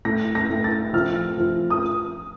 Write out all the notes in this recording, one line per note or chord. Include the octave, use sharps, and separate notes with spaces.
A2 A#6
A#6
A2
A6
F3 F6
F3
D#6